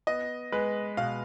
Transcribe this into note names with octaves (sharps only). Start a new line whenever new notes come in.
B3 D#5
G#3 B4
B2 F5